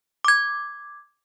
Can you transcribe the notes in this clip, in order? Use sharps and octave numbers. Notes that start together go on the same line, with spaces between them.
D6 G#6